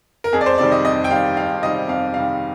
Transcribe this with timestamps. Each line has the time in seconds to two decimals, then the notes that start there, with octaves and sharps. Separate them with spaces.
0.24 A#4
0.32 F2 G#4
0.41 D5
0.46 C5
0.58 C3 D#3 G3 D5
0.72 D#5
0.84 F2 D#5
1.04 G5
1.10 C3 D#3 G3 F5
1.36 F2 F5
1.62 C3 D#3 G3 D#5
1.88 F2 F5
2.14 C3 D#3 G3 F5